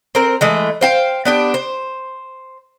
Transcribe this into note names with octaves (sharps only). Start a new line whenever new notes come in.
C4 A#4
E3 G#3 A3
C5 F5 G5
B3 D4 G4
C5